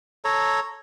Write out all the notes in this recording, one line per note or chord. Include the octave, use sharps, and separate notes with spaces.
A4 C#5 A#5